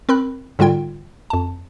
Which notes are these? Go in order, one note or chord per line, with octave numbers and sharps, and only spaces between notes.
C4 A#4 B5 F#6
G#2 D3 G3 F4 G5 G#6
F2 A5